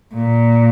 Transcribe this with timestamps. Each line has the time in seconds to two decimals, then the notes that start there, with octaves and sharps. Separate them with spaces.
0.13 A#2